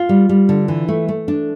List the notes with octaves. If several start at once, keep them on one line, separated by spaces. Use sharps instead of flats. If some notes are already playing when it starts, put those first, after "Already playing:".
Already playing: F4
G3
G3
D3
E3
A3
A3
D4